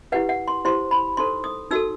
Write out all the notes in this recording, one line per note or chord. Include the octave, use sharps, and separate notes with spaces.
E4 G4 B4 F#5
F#5
C6
E4 G4 C5 C6
B5
D#4 A4 C5 C6
D#6
D#4 F#4 A4 E6